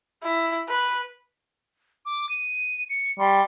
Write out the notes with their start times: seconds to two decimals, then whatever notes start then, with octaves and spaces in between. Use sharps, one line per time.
0.23 E4
0.69 B4
2.06 D6
2.29 D#7
2.90 C#7
3.19 G3 C6